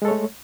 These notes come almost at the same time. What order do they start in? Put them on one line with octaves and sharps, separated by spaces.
G#3 A4 C#5 A3